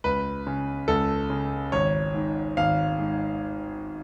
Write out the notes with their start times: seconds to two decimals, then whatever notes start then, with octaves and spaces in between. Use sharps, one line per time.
0.04 C#2 B4
0.47 C#3
0.88 C#2 A4
1.30 C#3
1.72 G#1 C#5
2.14 G#2
2.57 G#1 F5
2.99 G#2